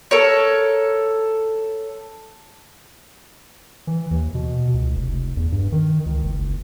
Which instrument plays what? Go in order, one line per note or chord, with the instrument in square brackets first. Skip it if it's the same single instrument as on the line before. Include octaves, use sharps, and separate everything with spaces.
[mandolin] A4 A#4 C#5
[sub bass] E3
D#2
B2
C#2
F1
E2
G2
D#3
C#2
F#1